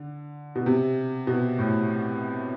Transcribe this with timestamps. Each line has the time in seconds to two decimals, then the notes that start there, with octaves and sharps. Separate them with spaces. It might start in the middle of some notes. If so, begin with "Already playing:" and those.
Already playing: D3
0.56 B2
0.66 C3
1.27 B2
1.59 A2